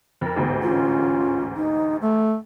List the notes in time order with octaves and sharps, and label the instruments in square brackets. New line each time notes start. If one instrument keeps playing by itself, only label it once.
[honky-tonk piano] F2 A#4
[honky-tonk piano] A1 D2 G#2 [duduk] B3
[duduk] C#4 [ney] F4
[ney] D#4
[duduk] A3 [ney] A4